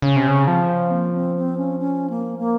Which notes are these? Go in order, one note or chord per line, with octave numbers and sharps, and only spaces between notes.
C#3 C#4
C3
C#3
F3 C4
A#3
C4
C4
C#4
C#4
A#3
A#3